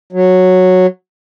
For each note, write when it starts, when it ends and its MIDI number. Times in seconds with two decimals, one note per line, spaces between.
0.13 0.87 54